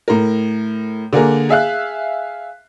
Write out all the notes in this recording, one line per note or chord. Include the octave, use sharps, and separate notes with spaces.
A2 A#4
D3 A#3 G#4 A#4
G#4 E5 F5 F#6